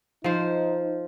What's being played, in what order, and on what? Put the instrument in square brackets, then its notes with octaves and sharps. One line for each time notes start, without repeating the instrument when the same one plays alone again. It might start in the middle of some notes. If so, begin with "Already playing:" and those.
[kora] F3 C5 [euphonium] D#4